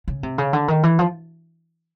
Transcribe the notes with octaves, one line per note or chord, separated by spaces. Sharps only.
C#3
C3
C#3
D3
D#3
E3
F3